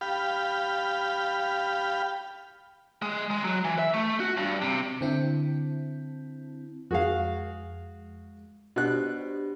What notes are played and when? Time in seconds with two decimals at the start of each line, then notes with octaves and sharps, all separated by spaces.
0.01 G4 F5 B5
3.02 G#3
3.31 G#3
3.44 F#3
3.64 E3
3.79 E5
3.94 A3
4.20 F#4
4.37 G2
4.62 C3
5.01 D3 C4 E4
6.91 F2 G#3 F#4 G#4 F5
8.76 B2 D4 G4 C5 F#6